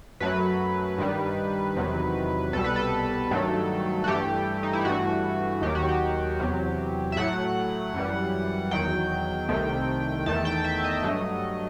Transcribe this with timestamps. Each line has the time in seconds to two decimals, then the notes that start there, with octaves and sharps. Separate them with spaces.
0.20 F#2 F#3 A3 B4
0.98 G2 D#3 G3
1.76 E2 C3 D#3 F#3
2.53 C2 B2 G3 A4
2.64 B4
2.76 A4
3.31 G2 D#3 F#3 A3
4.04 F#4
4.08 G2 E3 A3 G4
4.63 D#4
4.73 E4
4.85 G2 E3 A3 F#4
5.62 D#2 D#3 F#3 G4
5.75 F#4
5.89 G4
6.39 E2 C3 F#3
7.12 E5
7.16 A2 F#3 A3 F#5
7.94 F#2 E3 G3
8.71 E2 D#3 F#3 G5
9.49 C2 C3 D#3 A3
10.26 E2 D#3 A3 A5
10.45 G5
10.64 E5
10.84 D#5
11.03 G2 F#3 A3